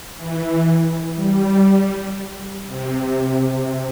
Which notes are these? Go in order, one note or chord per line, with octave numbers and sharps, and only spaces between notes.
E3
G3
C3